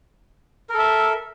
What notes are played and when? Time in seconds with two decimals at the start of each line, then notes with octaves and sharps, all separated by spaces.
0.70 A#4
0.74 A4
0.79 E5